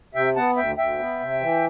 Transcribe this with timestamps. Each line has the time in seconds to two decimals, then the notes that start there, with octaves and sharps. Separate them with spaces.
0.14 C3 E5 G5
0.36 B3 F#5 A5
0.56 D2 E5 G5
0.78 D2 E5 G5
0.99 B3
1.19 C3
1.40 E3